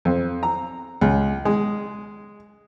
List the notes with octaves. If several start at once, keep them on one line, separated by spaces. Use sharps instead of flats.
F2
A#5
C#2
G#3